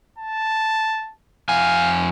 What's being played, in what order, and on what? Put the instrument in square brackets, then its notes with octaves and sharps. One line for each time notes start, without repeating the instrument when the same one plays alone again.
[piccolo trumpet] A5
[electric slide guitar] F2 G#5 [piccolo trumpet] F5